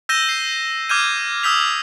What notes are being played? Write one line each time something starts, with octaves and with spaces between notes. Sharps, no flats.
E6 G6 A#6 D#7 E7 G7
C7
D6 F6 G6 G#6 D#7
D#6 E6 G6 B6 F7